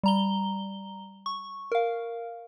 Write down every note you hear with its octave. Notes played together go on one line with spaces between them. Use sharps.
G3 A#5 G7
C#6
A#4 F5